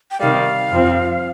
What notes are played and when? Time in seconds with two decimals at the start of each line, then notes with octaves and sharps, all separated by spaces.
0.11 G5
0.20 C3 D#3 G3 F5
0.71 F2 F3 C4